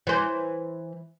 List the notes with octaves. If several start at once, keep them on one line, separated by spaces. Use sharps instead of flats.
E3 C5